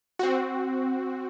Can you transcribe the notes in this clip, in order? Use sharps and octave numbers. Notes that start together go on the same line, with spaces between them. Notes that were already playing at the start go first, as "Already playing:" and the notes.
C4 F#4